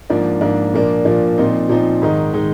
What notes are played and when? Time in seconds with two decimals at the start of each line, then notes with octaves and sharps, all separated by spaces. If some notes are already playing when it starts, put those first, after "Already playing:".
0.10 G#2 F3 A#3 D4
0.41 G#2 F3 A#3 D4
0.74 A#2 F3 A#3 D4
1.05 A#2 F3 A#3 D4
1.38 A#2 F3 C4 D#4
1.69 A#2 F3 C4 D#4
2.02 G#2 D#3 G#3 D#4
2.34 D#3 G#3 D#4